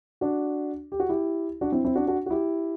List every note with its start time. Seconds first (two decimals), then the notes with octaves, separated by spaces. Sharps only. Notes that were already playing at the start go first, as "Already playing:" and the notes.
0.21 D4 F#4
0.92 G4
1.00 F#4
1.09 E4 G4
1.61 D4 F#4
1.72 C4 E4
1.85 C4 E4
1.95 D4 F#4
2.07 D4 F#4
2.26 F#4
2.30 E4 G4